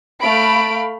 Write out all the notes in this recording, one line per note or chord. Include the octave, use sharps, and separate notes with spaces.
A3 F5 B5 D7